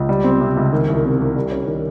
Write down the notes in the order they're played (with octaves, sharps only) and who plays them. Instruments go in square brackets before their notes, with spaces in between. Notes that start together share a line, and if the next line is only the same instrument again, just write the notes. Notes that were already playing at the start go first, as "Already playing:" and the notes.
Already playing: [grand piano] C#2
G3
C4
C3
C#2
D#3
C2
C3
C2
G3
C#4
D#3